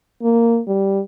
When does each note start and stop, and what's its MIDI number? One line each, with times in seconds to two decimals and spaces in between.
0.23 0.60 58
0.68 1.00 55